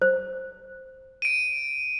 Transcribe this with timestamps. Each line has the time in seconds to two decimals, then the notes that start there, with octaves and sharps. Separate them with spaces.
0.02 C5
1.22 D7 D#7